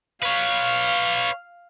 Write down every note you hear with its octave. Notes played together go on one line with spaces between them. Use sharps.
B4 C#5 F5